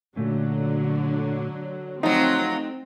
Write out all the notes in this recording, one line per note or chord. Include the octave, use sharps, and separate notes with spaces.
A#2 D3 F#3 A3 C#4
F3 F#3 A3 C4 D#4 G4 F#5